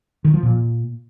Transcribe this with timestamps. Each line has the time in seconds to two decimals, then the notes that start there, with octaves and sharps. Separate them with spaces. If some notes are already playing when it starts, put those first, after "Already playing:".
0.25 D#3
0.34 F3
0.43 A#2